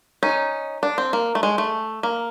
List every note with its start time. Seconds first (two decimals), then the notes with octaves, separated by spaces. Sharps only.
0.23 C#4 D#4
0.83 D4
0.98 C4
1.13 A#3
1.35 A3
1.43 G#3
1.58 A3
2.03 A#3